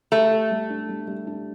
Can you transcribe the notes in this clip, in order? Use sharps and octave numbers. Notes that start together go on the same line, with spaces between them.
A3 G4
G4
G3
D4
G3
G3
D4